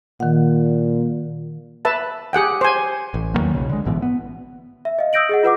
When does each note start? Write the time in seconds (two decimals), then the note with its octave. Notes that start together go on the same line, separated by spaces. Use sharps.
0.20 A#2 D#3 F#5
1.85 B4 E5 A5
2.33 G4 G#4 F#5 G5
2.61 C5 G#5
3.14 A1
3.34 E2 D#3 F#3 A#3
3.54 B1 C#3
3.69 D3 G#3
3.85 A1 G#2 B2 E3
4.02 B3
4.85 E5
4.99 D#5 F5
5.13 D#6 E6 G6 A#6 D7 F#7
5.29 G#4 D#5 F#5
5.43 F4 B4 F#5 D6